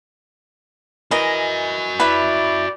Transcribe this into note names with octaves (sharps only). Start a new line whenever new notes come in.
E3 F#4 A#4 D#5 G#5
E4 B4 D5 E5